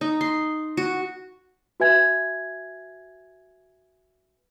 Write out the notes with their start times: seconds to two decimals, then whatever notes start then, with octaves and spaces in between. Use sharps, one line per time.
0.01 D#4
0.21 C6
0.77 F#4
1.80 F#4 B4 E5 G#5 G#6